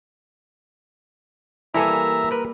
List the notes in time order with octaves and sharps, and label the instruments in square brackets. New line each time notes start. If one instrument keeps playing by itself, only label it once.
[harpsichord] E3 [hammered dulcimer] G3 A#3 [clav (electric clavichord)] E4 A4 G#5 [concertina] E5 A#5
[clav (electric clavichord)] A#4 B4